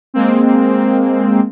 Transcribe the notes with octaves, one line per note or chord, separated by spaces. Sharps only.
G#3 A#3 C4